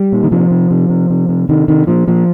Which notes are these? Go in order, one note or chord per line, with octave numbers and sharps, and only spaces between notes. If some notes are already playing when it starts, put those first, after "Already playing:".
Already playing: G3
A#2
D#3
C3 F3
C3
C3
C3
C3
C3
C3 D#3
C3 D#3
A#2 F3
A#2 F3